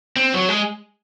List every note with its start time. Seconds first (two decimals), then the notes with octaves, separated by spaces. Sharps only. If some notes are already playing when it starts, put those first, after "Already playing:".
0.16 C4
0.33 F#3
0.49 G#3